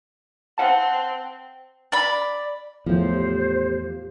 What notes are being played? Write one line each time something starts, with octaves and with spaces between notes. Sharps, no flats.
C4 F#5 A5
D5 B5
E2 A2 F3 C5
G4